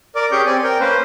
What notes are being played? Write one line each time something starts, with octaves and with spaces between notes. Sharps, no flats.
A#4 D5 D6
C#4 G4 G#4 C#6 G6
C4 D5 G#5
A#4 G5
A#3 C#4 B4 C5